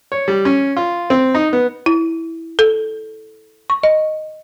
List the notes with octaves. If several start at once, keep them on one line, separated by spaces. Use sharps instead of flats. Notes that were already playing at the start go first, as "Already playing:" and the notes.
C#5
G3
C#4
F4
C4
D#4
B3
E4
A4
C#6
D#5